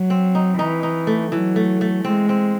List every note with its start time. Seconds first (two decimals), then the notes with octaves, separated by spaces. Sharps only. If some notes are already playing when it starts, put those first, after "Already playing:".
Already playing: F#3
0.10 C4
0.35 D#4
0.58 E3 D#4
0.83 D#4
1.07 A3
1.32 E3 F#3
1.56 A3
1.81 A3
2.04 G#3 C4
2.29 C4